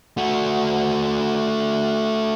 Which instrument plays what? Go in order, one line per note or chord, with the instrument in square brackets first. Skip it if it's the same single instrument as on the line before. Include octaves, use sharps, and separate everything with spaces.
[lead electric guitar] A3 F#4